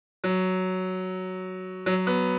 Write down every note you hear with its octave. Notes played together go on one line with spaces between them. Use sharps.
F#3
F#3
B3